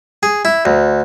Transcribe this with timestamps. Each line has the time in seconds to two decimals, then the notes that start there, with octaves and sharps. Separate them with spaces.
0.23 G#4
0.45 E4
0.65 D2